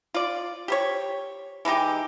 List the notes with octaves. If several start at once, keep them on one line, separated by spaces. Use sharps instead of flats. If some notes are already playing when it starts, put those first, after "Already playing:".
F4 D5
G4 C5 C#5
E3 G#3 D#4 G4